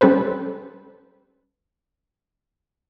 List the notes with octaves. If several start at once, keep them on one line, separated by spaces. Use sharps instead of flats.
G3 C#4 A4 B4 C5